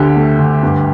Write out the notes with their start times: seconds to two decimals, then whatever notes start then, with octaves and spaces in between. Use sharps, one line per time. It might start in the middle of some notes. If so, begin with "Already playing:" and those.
Already playing: D2 D3 G4
0.16 A3
0.39 D2
0.63 G2